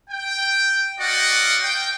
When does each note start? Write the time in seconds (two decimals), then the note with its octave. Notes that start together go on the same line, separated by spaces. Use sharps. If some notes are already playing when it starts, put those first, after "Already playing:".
0.10 G5
1.00 F#4 D5 D#5 F5 F#5
1.62 G5